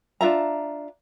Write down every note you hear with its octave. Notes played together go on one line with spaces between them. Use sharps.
D4 F4 E5 A#5